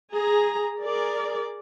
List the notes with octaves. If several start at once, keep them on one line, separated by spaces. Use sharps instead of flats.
G#4 A#5
G#4 A#4 D5